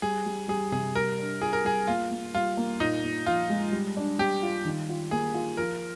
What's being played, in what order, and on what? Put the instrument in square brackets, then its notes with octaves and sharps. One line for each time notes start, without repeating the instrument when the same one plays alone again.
[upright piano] G3 [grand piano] G#4
[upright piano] G3
[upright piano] G3 [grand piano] G#4
[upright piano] C3 [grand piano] G#4
[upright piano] G3 [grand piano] A#4
[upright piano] D4
[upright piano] F4 [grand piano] G#4
[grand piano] A#4
[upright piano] G3 [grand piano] G#4
[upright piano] A#3 [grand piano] F4
[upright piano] A#3
[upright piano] G3 [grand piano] F4
[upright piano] A#3
[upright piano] A#2 [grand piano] D#4
[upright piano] A#2
[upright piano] F3 [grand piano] F4
[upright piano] G#3
G3
D4
[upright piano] G3 [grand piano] G4
[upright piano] F4
D#3
F4
[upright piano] A#3 [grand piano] G#4
[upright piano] F4
[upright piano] F3 [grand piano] A#4